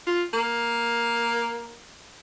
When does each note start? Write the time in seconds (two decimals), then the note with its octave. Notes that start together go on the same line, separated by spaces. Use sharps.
0.07 F4
0.33 A#3